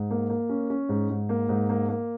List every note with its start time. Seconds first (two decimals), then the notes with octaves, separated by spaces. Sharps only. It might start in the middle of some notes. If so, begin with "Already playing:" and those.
Already playing: G#2
0.10 A#3
0.30 A#3
0.49 C#4
0.70 C#4
0.89 G#2
1.10 G#2
1.29 A#3
1.49 G#2
1.69 A#3
1.89 A#3